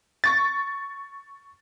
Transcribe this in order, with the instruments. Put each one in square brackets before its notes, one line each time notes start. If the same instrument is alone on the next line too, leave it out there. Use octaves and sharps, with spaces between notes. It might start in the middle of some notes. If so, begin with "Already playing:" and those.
[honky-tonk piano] C#6 A6